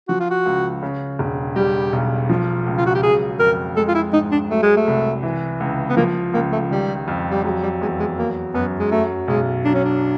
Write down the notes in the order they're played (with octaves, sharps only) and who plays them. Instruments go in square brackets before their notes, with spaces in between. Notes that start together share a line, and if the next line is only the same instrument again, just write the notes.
[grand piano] F3 [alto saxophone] F#4
[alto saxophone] F4
F#4
[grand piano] C#2
C#3
E1
[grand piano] G3 [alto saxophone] G4
[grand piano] B1
F3
C#2
[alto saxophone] F4
F#4
G4
[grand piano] F#3 [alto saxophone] G#4
[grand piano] F2 [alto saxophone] A#4
[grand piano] G#3 [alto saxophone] A4
[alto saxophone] F4
E4
[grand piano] G#2 [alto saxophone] D#4
[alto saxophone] D4
[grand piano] F#3 [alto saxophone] A3
[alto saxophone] G#3
A3
[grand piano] C2
E3
C#2
[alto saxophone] B3
[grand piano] F3 [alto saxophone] A#3
[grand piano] C#2 [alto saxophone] A#3
[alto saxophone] A3
[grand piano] D#3 [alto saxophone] G3
[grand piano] F2
[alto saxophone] G3
[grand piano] F#3 [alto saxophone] G#3
[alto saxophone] G3
[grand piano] E2 [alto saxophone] G#3
[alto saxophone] G#3
[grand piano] F#3 [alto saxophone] A#3
[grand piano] F#2 [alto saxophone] B3
[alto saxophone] G#3
[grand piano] F#3 [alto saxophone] A3
[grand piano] B1 [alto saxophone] G#3
[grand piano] F#3 [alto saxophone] D4
[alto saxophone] C#4
D4